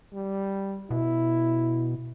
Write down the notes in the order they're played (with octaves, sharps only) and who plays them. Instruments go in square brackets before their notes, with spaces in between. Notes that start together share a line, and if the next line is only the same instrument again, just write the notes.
[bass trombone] G3
[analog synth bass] B2 [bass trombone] E4